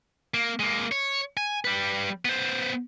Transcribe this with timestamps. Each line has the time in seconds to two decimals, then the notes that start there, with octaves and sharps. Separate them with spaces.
0.34 A#3
0.60 G#3 A#3
0.92 C#5
1.37 G#5
1.65 G3 B4
2.25 B3 C5